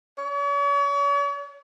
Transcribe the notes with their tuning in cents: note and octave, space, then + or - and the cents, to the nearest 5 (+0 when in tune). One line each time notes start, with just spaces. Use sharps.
C#5 +45